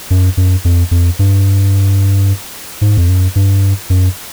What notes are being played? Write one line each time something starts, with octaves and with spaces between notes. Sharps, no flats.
F#2
F#2
F2
F2
G2
G#2
F2
F#2
G2
F#2